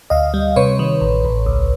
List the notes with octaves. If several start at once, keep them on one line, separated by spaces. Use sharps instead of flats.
D2 D#5 F5
G3
C3 B4 C#5
D#3
A1
A1
C#2